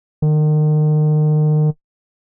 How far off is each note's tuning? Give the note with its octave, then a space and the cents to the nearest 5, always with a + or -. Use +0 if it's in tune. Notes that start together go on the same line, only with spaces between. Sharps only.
D#3 -35